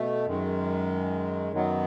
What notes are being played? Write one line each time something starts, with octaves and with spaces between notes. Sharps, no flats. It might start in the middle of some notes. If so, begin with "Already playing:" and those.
Already playing: B2 A3
F#2 D#3 G#3
F#2 D#3 F#3 B3